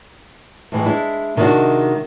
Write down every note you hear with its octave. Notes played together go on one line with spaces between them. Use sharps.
A2 E3 G#3
G#3 D4 E4
C3 D#3 G#3 B3 D4 F#4